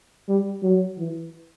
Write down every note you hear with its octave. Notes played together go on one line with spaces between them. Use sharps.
G3
F#3
E3